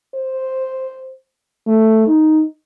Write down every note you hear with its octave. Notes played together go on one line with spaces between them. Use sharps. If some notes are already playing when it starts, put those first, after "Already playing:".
C5
A3
D#4